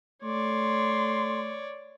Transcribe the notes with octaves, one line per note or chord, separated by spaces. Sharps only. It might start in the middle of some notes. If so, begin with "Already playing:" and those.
A3 C#5 D5 C6